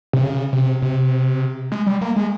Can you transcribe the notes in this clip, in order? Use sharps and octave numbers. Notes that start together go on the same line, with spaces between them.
C3
C#3
C3
C3
G#3
G3
A#3
G#3